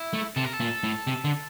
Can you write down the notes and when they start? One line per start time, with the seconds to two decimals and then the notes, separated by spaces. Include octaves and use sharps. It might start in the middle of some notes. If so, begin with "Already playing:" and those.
Already playing: E4
0.13 A3
0.37 C3 A4
0.45 A#4
0.54 A4
0.60 A#2
0.84 A2
1.07 C3
1.25 D3